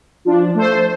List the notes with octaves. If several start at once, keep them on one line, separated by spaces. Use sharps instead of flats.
F3 D4
A3 A4 C5